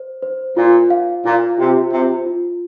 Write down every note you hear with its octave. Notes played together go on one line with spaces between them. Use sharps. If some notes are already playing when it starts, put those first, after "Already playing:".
Already playing: C5
C5
A#2 F4
F5
A#2 F4
C3 F4
C3 F4
F4